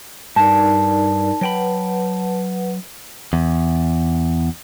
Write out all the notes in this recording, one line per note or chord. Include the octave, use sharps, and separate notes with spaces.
G2 D#4 A#4 D5 A5
F#3 B4 F#5 G5 B5
E2